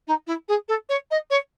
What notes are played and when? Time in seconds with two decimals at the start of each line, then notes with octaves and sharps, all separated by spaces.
0.07 D#4
0.27 E4
0.48 G#4
0.68 A4
0.89 C#5
1.11 D#5
1.30 C#5